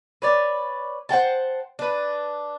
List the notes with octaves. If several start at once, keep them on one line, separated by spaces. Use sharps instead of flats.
B4 C#5 D5
C5 F#5 G5 A5
D4 B4